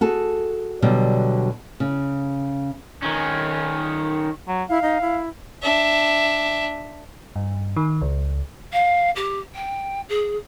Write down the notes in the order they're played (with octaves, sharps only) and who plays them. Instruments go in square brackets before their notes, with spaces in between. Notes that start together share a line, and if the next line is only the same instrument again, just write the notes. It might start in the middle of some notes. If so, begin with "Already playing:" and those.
[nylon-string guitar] F#4 G#4 A4
B2 D3 F#3 G3
C#3
[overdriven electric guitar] D#3 C#4
[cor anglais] F#3
[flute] E4 [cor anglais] F5
[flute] D#4
E4
[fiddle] D4 E5
[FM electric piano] G2
D#3
C#2
[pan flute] F5
G4
G5
G#4